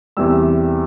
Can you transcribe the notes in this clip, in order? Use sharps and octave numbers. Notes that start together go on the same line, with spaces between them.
E2 C3 G3 E6